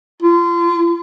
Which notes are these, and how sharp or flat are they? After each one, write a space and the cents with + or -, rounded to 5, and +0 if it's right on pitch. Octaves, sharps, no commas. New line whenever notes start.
F4 -30